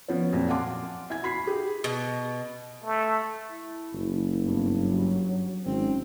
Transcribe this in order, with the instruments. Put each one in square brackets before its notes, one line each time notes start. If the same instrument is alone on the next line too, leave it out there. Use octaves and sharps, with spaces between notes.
[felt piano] F3 B3 C#4
F2 A#2 F#3
F5 F#5 G#5 A5 C6 D6
E4 G#5 G#6
F#4 B5 B6 C7
G4 G#4
[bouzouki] B2
[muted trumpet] A3
[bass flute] E4
[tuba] F#1
[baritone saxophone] G2 [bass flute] B3
[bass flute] F#3
[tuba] G#1 [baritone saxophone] C4 [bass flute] C#4